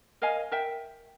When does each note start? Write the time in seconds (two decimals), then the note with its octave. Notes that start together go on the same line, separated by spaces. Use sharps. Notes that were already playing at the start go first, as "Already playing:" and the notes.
0.22 A#4 D#5 F5 G#5
0.52 A#4 E5 G5